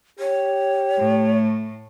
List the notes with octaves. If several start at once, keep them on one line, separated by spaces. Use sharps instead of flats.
G4 C#5
A2 A3